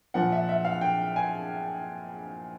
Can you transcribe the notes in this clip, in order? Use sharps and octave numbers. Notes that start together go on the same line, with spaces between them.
A#2 F3 F#5
E5
E5
F5
G5
G#5